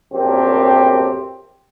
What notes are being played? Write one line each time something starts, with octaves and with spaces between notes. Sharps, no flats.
A#1 F#2 A2 C4 G4